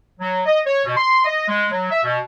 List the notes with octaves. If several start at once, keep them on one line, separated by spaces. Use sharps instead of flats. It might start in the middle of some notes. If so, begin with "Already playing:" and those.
F#3
D#5
C#5
B2
C6
D#5
G#3
F#3
E5
B2